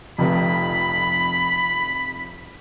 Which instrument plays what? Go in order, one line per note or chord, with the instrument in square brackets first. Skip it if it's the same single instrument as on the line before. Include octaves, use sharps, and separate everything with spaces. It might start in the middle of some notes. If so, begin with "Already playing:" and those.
[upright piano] F1 F2 [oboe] B5